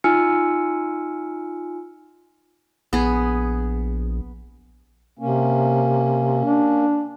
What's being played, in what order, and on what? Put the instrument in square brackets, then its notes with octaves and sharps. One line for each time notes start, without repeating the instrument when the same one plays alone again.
[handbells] D#4 F4 G#5 E6 F6 C#7
[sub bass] A#1 [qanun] B3 G#4
[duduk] C3 [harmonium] A#3 C#4
[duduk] D4